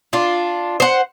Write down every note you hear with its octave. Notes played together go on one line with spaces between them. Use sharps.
D4 F4
C5 F#5